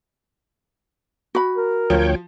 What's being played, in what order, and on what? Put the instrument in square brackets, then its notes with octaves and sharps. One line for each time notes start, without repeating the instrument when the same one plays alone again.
[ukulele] F#4 B5
[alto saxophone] A#4
[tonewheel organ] D2 C#5 G5 [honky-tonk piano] F3